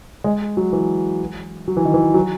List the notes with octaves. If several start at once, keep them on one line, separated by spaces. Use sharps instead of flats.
G#3
F#3
E3
F#3
E3
D#3
E3
F#3